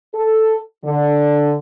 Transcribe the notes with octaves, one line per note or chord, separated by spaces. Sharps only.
A4
D3